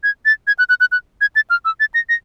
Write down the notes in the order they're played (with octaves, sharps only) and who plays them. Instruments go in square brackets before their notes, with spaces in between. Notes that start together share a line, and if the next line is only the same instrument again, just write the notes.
[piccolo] G#6
A6
G#6
F#6
F#6
F#6
F#6
G#6
A6
F6
E6
A6
A#6
A#6